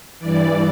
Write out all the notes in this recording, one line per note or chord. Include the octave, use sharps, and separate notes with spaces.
G2 E3 D5